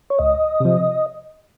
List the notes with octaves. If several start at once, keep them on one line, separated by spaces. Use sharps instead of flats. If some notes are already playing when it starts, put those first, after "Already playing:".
C#5
C#2 D#5
C3 F3